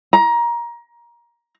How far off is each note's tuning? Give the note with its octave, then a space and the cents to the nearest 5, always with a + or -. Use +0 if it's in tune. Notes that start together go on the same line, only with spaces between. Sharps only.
A#5 +20